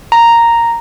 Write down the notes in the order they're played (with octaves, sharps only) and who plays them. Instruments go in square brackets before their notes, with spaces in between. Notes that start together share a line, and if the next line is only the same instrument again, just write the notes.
[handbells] A#5